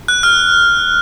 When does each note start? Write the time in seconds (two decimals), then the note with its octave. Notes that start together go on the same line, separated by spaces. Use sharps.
0.08 F#6
0.23 F6